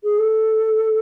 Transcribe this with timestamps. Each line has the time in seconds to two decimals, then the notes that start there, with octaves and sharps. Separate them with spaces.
0.03 G#4
0.18 A4